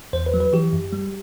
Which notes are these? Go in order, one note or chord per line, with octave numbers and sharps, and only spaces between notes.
E2 C5
B4
F#3
B4
E3 G4
F#2
G3